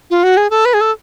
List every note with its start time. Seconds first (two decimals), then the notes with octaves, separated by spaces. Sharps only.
0.10 F4
0.24 F#4
0.37 G#4
0.50 A4
0.65 B4
0.74 G#4
0.81 A4